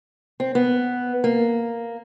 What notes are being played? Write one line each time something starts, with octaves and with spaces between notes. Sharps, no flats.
C4
B3
A#3